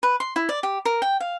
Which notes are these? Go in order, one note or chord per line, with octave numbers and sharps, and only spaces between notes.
B4
C6
E4
D5
G4
A#4
G5
F5